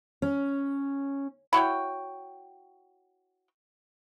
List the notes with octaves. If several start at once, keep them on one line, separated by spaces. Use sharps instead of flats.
C#4
E4 F#4 C#5 G5